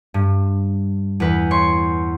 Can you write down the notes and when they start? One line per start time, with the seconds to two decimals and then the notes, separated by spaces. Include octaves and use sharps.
0.14 G2
1.20 E2 B4
1.51 C#5 C6 C#6